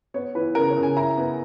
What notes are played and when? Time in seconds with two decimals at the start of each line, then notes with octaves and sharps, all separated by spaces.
0.14 B3 C#5
0.35 E3 B4
0.55 C#3 A#4
0.69 C#5
0.76 C#3
0.83 G#5
0.97 E4 A#5
1.17 B3